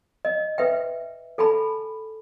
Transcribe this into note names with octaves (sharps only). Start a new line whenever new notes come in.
D#5
B4 E5 G5
A4 G#5 A5 B5